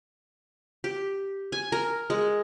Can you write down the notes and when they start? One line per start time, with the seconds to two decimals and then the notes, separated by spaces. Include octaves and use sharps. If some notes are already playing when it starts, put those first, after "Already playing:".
0.84 G4
1.52 G#5
1.72 A#4
2.10 G#3